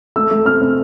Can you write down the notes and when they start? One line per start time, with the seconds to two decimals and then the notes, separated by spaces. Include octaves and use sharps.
0.16 A3 E6
0.31 A3
0.45 C4 F6
0.61 C4